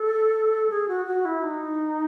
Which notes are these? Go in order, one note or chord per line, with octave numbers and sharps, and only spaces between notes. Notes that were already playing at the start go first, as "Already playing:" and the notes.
Already playing: A4
G#4
F#4
F#4
E4
D#4